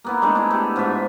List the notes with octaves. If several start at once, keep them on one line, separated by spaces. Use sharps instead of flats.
A#3 B3 E4
G#3 A3 D4 D#4
D4 E4
A3 G4 G#4
G#2 F4 C#5 E5